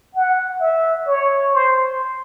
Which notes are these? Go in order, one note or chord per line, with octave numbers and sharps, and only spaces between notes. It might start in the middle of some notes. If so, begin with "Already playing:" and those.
F#5
E5
C#5
C5